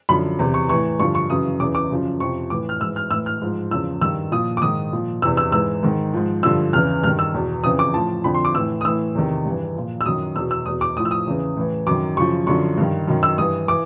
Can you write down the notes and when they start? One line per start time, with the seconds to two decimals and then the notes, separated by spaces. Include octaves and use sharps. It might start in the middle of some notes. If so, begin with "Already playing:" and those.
0.09 F#2 D3 F3 B5
0.39 E2 C3 E3
0.54 C#6
0.69 A2 E3 C#6
1.00 G2 D3 F3 C#6
1.15 C#6
1.30 F#2 C#3 E3 D#6
1.60 E2 C#3 E3 D6
1.75 D6
1.90 F#2 C#3 F3
2.20 F2 C3 F3 C#6
2.50 A2 E3 D6
2.69 F6
2.80 G#2 E6
2.84 E3
2.96 F6
3.11 A2 E3 E6
3.26 F6
3.41 G#2 F3
3.71 E2 C#3 F3 E6
4.01 G2 D#3 E6
4.32 A#2 F3 D#6
4.57 D6
4.62 G#2 D#3 D#6
4.92 A#2 F3
5.22 E2 C3 E3 E6
5.37 E6
5.52 G#2 E3 E6
5.83 G#2 D#3
6.14 G#2 F3
6.43 G2 D3 F3 E6
6.73 E2 C#3 E3 F6
7.03 G2 D#3 F6
7.19 E6
7.34 E2 B2
7.64 F2 C#3 E3 D#6
7.79 D6
7.94 A2 F3 A5
8.24 F2 D3 F3 B5
8.34 C6
8.45 D6
8.55 A2 E3 E6
8.81 D#6
8.84 A2 E3 E6
9.15 E2 C3 D#3
9.45 G2 E3
9.75 A#2 F3
10.01 E6
10.06 F#2 D#3 D#6
10.36 E2 B2 E6
10.51 E6
10.66 E2 B2 D#6
10.81 D6
10.96 A2 F3 D#6
11.05 E6
11.11 D#6
11.26 E2 C#3 E3
11.57 A2 E3
11.87 F#2 D#3 D6
12.17 F#2 C#3 F3 C#6
12.47 F#2 D3 F3 C#6
12.77 G2 D#3
13.08 F#2 D#3
13.23 E6
13.38 G2 E3 D#6
13.68 E3 D6